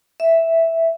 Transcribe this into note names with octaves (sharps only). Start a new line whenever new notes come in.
E5